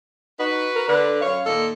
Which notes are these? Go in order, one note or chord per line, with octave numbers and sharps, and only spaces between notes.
D#4 F#4 B4
A#4
D3 B4
F#2 C#5 F5
A#2 D#3 A4